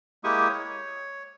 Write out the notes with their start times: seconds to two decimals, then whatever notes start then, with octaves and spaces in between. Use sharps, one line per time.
0.24 G#3 A#3 E4 G4 C#6 D#6
0.50 C#5